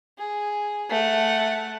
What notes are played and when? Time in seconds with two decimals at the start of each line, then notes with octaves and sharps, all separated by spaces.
0.18 G#4
0.90 A3 F#5